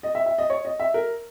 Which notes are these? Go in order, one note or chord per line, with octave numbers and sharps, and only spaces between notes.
D#5
E5
E5
D#5
C#5
D#5
E5
A#4